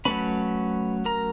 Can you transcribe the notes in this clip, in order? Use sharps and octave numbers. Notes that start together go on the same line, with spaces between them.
F#3 A3 C#4 B4 B5
A#4 A#5